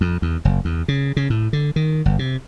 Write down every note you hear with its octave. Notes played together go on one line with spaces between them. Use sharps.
F2
E2
F#1
E2
C#3
C#3
A2
D3
D#3
G1
C3